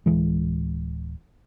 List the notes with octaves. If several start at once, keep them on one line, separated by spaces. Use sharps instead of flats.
D1 C#2 E3 G#3